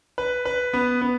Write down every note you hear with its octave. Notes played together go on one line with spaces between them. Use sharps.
B4
B4
B3
B3